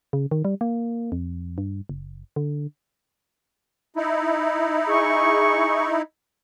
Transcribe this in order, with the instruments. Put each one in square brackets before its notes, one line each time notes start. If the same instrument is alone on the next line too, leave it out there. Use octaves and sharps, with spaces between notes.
[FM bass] C#3
D#3
G3
A#3
F2
G2
F#1
D3
[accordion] D#4 E4
[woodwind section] G#4 C#6